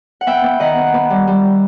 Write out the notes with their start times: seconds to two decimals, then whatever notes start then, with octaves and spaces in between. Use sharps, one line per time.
0.21 F#5
0.27 B3 E5 G5
0.44 B3
0.60 D#3 D#5 F#5
0.77 B3
0.94 B3
1.10 G3
1.27 G3